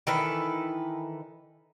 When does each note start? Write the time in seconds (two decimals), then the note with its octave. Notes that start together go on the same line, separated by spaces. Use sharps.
0.07 D#3 E3 A4 B4